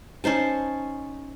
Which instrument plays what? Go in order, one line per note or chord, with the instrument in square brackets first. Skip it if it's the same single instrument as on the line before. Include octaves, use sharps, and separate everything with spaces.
[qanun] C#4 D#4 C5 A5